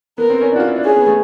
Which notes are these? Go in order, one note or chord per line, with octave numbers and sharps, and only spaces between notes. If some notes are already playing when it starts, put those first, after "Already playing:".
B3 A#4
C4
C#4
D4
F#4
F4
E4
D4
C#4 G#4
B3
A3